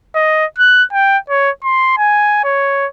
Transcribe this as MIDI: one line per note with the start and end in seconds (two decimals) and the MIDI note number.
0.15 0.45 75
0.58 0.84 90
0.93 1.18 79
1.30 1.50 73
1.64 1.96 84
1.98 2.44 80
2.44 2.87 73